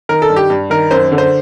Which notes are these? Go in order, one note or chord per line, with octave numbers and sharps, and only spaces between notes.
D#3 A#4
A4
G2
G4
G2
D#3 A#4
F#2 C5
D3
C5